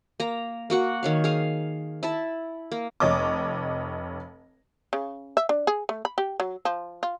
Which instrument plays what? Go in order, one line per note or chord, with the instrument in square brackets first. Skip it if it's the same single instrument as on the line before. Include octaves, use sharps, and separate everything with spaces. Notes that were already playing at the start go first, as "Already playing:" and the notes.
[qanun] A#3 A#5
A#3 F#4 F#5
D#3 C#5 F5
G#4 F5
E4 E5 A5
A#3
[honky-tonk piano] F1 C#5 D#5 D6
[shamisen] C#3
E5
D4
G#4
A3
B5
G4
F#3
F3
F4